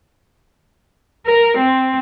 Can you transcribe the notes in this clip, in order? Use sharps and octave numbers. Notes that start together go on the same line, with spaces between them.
A#4
C4